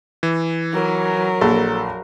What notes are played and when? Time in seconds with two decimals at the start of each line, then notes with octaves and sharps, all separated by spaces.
0.23 E3
0.73 F#3 A#4
1.41 A#1 A4